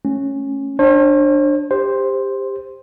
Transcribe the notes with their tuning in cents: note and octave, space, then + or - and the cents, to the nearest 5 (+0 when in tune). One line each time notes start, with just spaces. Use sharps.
A3 +0 C#4 -10
D4 +10 C5 +45
G4 +20 C5 +0